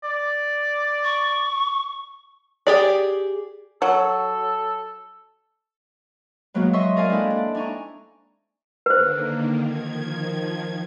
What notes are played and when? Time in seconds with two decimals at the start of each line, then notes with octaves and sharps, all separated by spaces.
0.04 D5
1.04 C#6
2.67 G4 G#4 D5
3.82 F#3 A4
6.54 B2 F#3 G#3 A#3 B3 F#4
6.73 D#5 E5 C6 C#6 E6
6.96 A#4 D5 D#5 F5 G#5
7.10 G#3 C4 D4 E4 A4
7.30 D4
7.55 D4 D#4 G#5 A#5 C#6
8.86 D3 D#3 A#3 B4 C5
9.64 D#3 F3 G#6